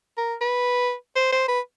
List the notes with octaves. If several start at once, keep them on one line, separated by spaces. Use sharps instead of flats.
A#4
B4
C5
C5
B4